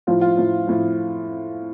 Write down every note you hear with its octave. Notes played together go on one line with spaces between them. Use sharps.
A2 F3 F4
F4
A2 F3
A2 F3